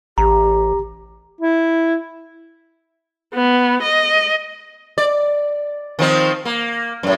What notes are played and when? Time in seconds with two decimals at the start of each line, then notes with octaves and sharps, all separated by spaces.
0.18 A1 G4 A#5
1.41 E4
3.34 B3
3.83 D#5
4.98 D5
5.99 D#3 F3 C4
6.45 A#3
7.03 F#2 A2